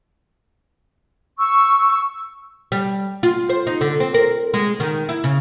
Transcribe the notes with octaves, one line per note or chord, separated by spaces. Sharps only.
C#6 E6
G3
F4
C5
D#4
D3
C4
A#4
G#3
D#3
E4
C#3